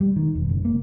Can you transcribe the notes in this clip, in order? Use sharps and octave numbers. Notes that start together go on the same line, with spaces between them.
G3
D#3
E1
F#1
A#3